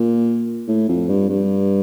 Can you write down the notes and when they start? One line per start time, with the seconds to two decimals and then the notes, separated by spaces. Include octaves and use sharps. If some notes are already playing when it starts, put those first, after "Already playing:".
Already playing: A#2
0.68 A2
0.89 F2
1.08 G2
1.29 G2